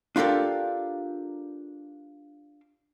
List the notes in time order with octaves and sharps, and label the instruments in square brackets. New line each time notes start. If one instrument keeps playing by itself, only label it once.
[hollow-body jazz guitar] D4 F4 G4 A4 A#4